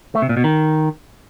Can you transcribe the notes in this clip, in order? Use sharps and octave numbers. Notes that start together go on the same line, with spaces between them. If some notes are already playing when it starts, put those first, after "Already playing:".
A3
C3
A#2
B2
D#3